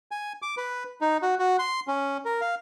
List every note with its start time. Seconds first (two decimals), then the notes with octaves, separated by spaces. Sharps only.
0.11 G#5
0.42 D6
0.57 B4
1.01 D#4
1.22 F#4
1.39 F#4
1.59 C6
1.88 C#4
2.25 A#4
2.41 F5